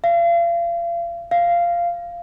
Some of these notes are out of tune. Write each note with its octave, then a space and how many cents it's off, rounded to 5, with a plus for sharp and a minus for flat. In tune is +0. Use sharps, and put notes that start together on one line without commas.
F5 -35
F5 -10